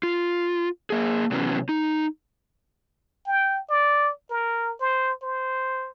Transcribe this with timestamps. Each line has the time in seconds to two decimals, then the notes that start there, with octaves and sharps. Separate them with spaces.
0.03 F4
0.90 A#3 G#4
1.31 C3 E3 F#3 B3 C#4
1.69 D#4
3.27 G5
3.70 D5
4.30 A#4
4.80 C5
5.22 C5